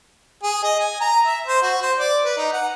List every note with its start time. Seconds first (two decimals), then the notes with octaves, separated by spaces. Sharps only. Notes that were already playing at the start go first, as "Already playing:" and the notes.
0.43 G#4
0.64 D#5
0.80 G#5
1.01 A#5
1.26 E5
1.46 C5
1.62 F#4
1.82 C5
1.98 D5
2.25 B4
2.37 D#4
2.53 F#5